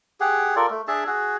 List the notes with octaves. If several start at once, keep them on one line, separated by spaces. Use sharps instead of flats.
G4 G#4 F#5
F4 A4 A#4 D5
A3
D4 G#4 E5 A5
F#4 G#4